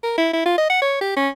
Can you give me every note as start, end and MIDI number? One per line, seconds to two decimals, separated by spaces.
0.04 0.14 70
0.18 0.31 64
0.34 0.45 64
0.46 0.55 65
0.58 0.69 75
0.70 0.82 78
0.82 0.98 73
1.01 1.16 67
1.17 1.29 61